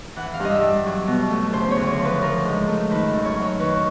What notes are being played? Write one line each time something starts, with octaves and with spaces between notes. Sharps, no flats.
E3 F#5
F5
G2
D#5
E5
G3
F#3
B2
A3
C#3 C5
C#5
D2
C#5
F3
B4
F3 A#4
G#2
A3
D#3 B4
F#2
C#5
F#3
C#5
D#3 B4